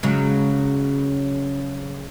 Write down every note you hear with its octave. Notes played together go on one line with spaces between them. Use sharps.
C#3 F#3 G#3